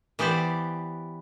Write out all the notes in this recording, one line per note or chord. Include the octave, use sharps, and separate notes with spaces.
E3 B3 G4 C5 D5